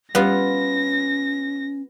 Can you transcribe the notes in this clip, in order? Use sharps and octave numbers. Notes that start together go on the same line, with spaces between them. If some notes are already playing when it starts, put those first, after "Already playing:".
G3 B3 C#4 F4 G4 A#6